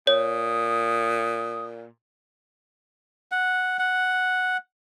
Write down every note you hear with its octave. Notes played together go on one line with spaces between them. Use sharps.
A#2 C#5 D#6
F#5
F#5